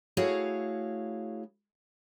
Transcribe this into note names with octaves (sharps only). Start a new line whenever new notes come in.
A3 E4 F#4 G#4 C#5 F5